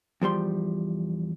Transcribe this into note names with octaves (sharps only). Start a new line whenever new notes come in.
E2 F3 G3 C6